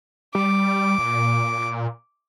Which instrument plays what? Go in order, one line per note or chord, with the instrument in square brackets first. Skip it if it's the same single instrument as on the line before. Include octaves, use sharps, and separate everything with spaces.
[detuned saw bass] G3 [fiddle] D6
[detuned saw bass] A#2